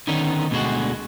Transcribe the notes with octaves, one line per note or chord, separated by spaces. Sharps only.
D3 D#3 B3 C#4 D#4
D2 B2 D3 G#3 F#4